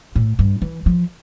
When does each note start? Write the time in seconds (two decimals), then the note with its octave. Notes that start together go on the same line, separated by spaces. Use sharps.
0.16 A2
0.39 G2
0.62 E3
0.86 F3